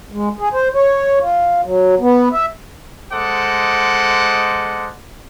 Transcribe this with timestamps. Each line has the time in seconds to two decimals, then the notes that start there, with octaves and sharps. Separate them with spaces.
0.11 G#3
0.39 G#4
0.53 C5
0.75 C#5
1.20 F4
1.64 F#3
2.00 B3
2.33 E5
3.12 G#3 A4 C5 D#5 F#5 D6